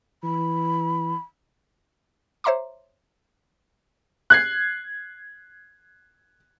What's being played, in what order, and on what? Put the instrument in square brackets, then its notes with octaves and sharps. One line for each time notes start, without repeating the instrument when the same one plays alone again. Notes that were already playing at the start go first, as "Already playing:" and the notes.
[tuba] E3 [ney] B5
[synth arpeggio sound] C5 C#5 E5 A#5 C6 D6
[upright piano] F#6 G#6 C7